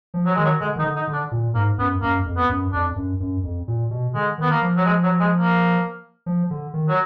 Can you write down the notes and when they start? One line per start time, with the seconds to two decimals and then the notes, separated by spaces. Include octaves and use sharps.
0.14 F3
0.26 F#3
0.35 D#3 G#3
0.44 F#3
0.61 D3 G#3
0.76 D#3 D#4
0.84 D3
0.96 D#4
1.07 D3
1.13 D4
1.32 A#2
1.55 G#2 A#3
1.78 F#2 B3
2.02 F#2 A#3
2.26 F2
2.37 B3
2.49 F#2
2.72 F2 D4
2.96 F#2
3.20 F#2
3.43 F2
3.68 A#2
3.91 B2
4.14 D3 G#3
4.38 D#3 B3
4.50 A#3
4.62 F3
4.77 F#3
4.85 G#3
5.03 F#3
5.20 G#3
5.38 A#3
6.26 F3
6.51 D3
6.74 D#3
6.89 F#3